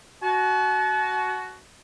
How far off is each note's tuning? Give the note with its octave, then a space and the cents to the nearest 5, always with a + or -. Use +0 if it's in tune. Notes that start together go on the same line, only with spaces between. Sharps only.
F#4 +5 A5 -40